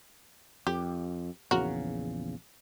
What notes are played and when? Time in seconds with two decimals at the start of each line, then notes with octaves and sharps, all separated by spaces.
0.67 F2 G4
1.51 A#1 E2 C#3 F#4 A#4